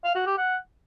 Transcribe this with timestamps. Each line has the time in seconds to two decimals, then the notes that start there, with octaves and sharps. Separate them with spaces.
0.04 F5
0.15 F#4
0.26 G4
0.37 F#5